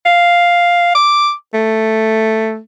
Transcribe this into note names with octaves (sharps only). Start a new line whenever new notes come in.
F5
D6
A3